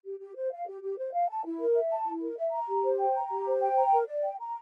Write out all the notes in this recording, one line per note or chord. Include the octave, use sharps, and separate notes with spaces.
G4
G4
C5
F5
G4
G4
C5
F5
A5
E4
A#4
E5
A5
E4
A#4
E5
A#5
G4
C5
G5
A#5
G4
C5
G5
A#5
A#4
D5
G5
A#5